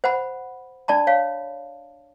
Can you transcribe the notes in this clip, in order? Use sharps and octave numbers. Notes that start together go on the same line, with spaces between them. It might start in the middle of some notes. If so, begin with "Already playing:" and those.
C5 F#5 B5
D4 D5 A5 B5
C#5 F5